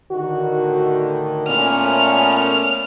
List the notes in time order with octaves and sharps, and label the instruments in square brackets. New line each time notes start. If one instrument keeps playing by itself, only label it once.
[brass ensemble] A2 D3 D#3 [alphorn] F#4
[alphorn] A#2 [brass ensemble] A3 B3 C#4 [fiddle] F6